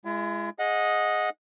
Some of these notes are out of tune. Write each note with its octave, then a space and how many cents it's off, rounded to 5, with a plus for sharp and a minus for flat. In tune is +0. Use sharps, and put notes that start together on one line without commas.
G#3 +0 E4 +45
G#4 +0 D#5 +5 F#5 -25